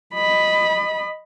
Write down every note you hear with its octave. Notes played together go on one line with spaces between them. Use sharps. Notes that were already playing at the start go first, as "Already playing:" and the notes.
D#5 B5